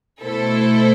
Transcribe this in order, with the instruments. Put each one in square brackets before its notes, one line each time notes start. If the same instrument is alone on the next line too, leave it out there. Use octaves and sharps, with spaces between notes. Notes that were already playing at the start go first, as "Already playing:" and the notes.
[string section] B2 A3 E4 A4 C5